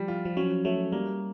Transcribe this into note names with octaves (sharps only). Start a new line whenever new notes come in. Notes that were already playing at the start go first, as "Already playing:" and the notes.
Already playing: F3 G3
F4
F3
F#3 C#4
F#3 A3
G3 A#3